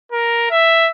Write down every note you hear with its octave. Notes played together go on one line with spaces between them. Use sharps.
A#4
E5